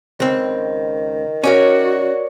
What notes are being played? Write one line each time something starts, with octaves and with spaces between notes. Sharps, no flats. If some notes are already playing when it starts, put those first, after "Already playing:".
C#2 D#3 C4
C#4 F#4 A#4 C#5 D5